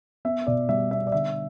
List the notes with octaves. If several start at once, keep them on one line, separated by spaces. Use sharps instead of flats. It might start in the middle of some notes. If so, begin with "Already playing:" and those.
B3 E5
B2 D5
G3 E5
B3 E5
D5
D3 E5